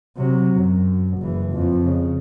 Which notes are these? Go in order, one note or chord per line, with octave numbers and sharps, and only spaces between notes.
C3 F#3
F#2
F#1 E3
F2
C#3